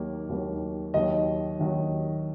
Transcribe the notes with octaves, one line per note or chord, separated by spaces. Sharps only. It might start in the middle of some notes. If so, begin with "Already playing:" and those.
Already playing: D#2 D#3 F#3 A#3
D#2 D#3 F#3 A#3
D#2 D#3 F#3 D#5
D#2 D#3 F#3